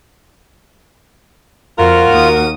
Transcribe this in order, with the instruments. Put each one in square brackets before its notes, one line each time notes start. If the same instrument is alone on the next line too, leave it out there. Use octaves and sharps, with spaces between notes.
[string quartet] F2 [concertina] F4 [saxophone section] F#4 A#4
[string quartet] D#2 D#6